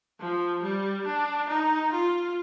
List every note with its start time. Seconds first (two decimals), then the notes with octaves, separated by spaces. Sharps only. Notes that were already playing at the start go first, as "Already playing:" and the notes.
0.20 F3
0.63 G3
1.06 D4
1.49 D#4
1.92 F4